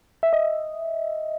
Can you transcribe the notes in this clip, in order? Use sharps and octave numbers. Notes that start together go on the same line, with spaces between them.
E5
D#5